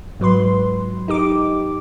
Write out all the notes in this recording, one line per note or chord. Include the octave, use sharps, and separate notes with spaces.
G#2 F#3 B4 C6
D#4 G4 D6